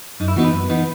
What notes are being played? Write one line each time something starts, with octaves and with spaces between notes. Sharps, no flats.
F#2 D#4
E4
E3 B3 D#4 F#4
B4
F#2
E3 B3 D#4